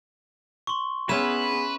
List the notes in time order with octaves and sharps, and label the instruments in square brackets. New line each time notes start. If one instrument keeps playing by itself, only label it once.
[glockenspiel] C6 C#6
[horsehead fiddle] B3 G#4 [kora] C#4 E4 [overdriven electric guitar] B4 [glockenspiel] E7